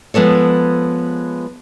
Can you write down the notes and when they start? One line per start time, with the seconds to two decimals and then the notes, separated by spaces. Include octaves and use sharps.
0.14 F3 G#3 B3 A4 C#5